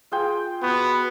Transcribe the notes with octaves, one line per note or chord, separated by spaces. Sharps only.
F4 G#4 G5
B3 F#4